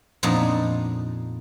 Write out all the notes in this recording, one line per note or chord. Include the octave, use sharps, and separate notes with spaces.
F2 A#2 B3 D4 D#4